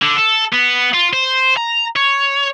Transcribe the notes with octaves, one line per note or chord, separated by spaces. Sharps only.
D3
A4
B3
F4
C5
A#5
C#5